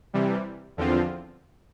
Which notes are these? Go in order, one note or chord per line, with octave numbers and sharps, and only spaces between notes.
C3 E3 G3
E2 D3 F3 C4 F4